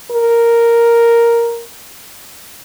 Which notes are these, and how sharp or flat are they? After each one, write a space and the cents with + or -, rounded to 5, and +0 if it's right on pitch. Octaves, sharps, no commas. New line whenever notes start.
A#4 +0